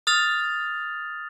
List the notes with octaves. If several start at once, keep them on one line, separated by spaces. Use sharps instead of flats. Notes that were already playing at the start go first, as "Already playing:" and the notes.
D#6 F6 A6 F7